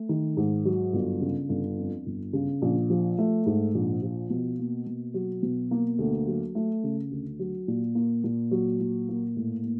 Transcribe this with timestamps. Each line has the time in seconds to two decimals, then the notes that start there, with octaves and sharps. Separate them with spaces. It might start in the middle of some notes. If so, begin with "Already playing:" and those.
Already playing: A3
0.09 D#3
0.37 G#2
0.65 F#3
0.93 G1
1.21 C#3
1.49 G1
1.77 F2
2.06 G1
2.33 C#3
2.62 A#1
2.90 F3
3.18 A3
3.46 G#2
3.75 A#1
4.02 F3
4.30 B2
4.59 A#3
4.86 B2
5.14 F#3
5.43 B2
5.71 A#3
5.98 D2
6.27 F#3
6.55 A3
6.84 C#3
7.11 D2
7.39 F#3
7.68 A#2
7.95 A#3
8.24 A#2
8.51 F#3
8.80 A#2
9.09 A#3
9.36 A2
9.64 A#3